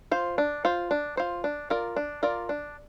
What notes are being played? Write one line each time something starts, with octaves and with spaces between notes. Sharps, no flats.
F4 C5
D4
F4 C5
D4
F4 C5
D4
F4 A#4 D5
D4
F4 A#4 D5
D4